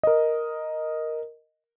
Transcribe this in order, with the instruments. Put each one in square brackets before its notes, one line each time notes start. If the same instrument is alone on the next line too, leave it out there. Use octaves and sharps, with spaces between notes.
[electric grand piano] A#4 D#5